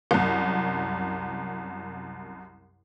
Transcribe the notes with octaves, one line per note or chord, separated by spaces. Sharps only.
C2 F#2